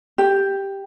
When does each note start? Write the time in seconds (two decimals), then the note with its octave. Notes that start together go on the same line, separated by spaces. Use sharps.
0.18 G4